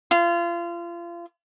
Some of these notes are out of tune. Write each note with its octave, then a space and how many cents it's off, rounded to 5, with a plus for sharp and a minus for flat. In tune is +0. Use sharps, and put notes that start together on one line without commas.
F4 -30